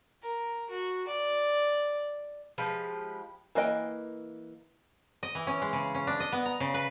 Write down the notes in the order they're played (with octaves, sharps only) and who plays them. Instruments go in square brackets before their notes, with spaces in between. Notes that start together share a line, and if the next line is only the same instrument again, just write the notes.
[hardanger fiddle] A#4
F#4
D5
[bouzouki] F3 G#3 G4 B4
[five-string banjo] E3 A#3 B4 D#5 G5
[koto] D#5
E3
C#4
G#3
C#3
C#4
D4
D#5
B3
A#5
C#3
B4